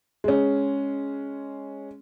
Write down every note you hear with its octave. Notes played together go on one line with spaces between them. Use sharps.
G#3 C#4